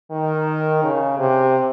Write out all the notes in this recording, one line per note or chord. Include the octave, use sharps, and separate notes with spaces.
D#3
C#3
C3